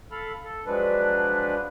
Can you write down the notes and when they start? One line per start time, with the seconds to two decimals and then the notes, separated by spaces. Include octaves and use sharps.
0.11 A4 F5 B5
0.44 A4
0.66 F3 F#3 G#3 D4 B4